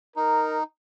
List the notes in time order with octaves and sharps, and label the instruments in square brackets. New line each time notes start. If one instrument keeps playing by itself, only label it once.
[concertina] D#4 [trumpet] A#4